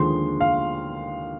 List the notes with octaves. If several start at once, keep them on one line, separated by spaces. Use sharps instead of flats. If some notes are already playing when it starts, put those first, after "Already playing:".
Already playing: D#2 D3 F3 G#3 C6
F5